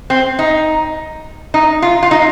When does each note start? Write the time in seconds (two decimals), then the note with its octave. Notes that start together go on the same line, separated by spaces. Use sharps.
0.10 C4
0.39 D#4
1.54 D#4
1.82 F4
2.03 F4
2.11 D#4